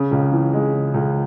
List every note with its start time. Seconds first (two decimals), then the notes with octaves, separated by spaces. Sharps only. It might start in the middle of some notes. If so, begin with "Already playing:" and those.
Already playing: C#3
0.11 C#2
0.32 E3
0.54 G#3
0.74 C#3
0.94 C#2